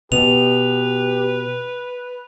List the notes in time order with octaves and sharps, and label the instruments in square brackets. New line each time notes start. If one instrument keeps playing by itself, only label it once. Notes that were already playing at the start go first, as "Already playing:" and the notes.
[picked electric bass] B2 B3 [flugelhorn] G4 [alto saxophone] B4 [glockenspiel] F7